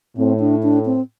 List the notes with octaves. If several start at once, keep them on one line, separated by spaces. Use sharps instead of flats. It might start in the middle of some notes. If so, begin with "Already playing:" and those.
A2 C4
D4
D4
C4